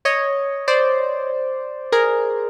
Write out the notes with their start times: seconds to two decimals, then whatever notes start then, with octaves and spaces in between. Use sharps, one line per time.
0.05 C#5 D#5
0.68 C5 D5
1.92 G#4 A#4